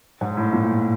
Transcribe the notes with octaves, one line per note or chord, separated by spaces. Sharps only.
G#2
A2
A#2